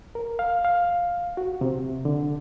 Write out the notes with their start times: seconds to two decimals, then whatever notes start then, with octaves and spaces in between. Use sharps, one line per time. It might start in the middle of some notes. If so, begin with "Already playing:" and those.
0.15 A#4
0.39 F5
0.65 F5
1.37 F#4
1.61 C3
2.05 D3